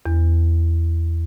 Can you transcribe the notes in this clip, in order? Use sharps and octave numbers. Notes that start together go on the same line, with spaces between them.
E2